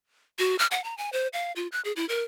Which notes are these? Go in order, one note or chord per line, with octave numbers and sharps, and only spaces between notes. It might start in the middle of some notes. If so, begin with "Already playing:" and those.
F#4
F6
F#5
A#5
G#5
C5
F5
F4
F#6
G#4
E4
A#4